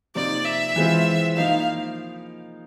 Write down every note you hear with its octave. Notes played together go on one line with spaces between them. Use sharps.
C3 F3 A#3 D#4 D5
E5
E3 G#3 C4 F4
F3 A#3 D#4 F5